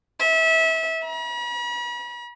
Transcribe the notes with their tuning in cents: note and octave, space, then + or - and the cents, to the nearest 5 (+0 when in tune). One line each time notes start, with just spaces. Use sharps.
E5 -25
B5 -45